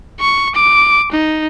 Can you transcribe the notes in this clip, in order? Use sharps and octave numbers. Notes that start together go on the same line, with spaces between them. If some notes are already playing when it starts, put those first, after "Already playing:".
C#6
D6
D#4